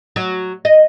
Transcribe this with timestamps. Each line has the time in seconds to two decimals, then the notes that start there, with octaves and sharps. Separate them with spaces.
0.16 F#3
0.65 D#5